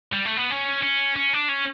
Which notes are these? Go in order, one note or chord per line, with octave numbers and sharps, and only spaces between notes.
G3
A3
B3
C#4
C#4
C#4
D4
C#4